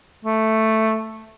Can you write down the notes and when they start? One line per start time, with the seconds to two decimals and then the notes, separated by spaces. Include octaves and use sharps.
0.25 A3